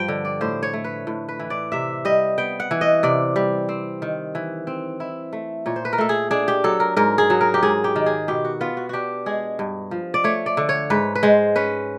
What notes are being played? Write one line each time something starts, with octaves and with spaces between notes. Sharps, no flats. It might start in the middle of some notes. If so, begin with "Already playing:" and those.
Already playing: G2 F3 G5
D3
D5
A2 C5
C#5
A3
B4
A2
B4
E3
D5
C3 E5
G3 D#5
B3 G5
F#5
E3
D#5
C3 D5
G3
C4
D#3
E3
C4
E4
A3
A#2 C#5
C5
B4
A#4
A3 A4
G#4
D4 G#4
G4
F#3 A4
A#4
G#2 A#4
G#4
F#3
A#4
G4
G#2 G#4
G4
D#3
G#4
B2 G4
F#4
B3 F4
F#4
D4 F#4 G4
G#3 G#4
G2
F3
D5
A3 C#5
D5
D3
C#5
G#2 B4
B4
G#3 C5
C#4 B4